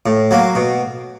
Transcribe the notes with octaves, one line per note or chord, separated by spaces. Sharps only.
A2
F#3 A#3
B2